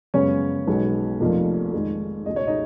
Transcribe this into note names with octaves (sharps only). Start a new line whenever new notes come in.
F#2 C#3 G#3 B3 C#4 C#5
B1 B2 G#3 B3
F1 F2 F3 A#3
F2 D#3 G#3
C#2 B2 G#3 D#5
C#5
D#4 D#5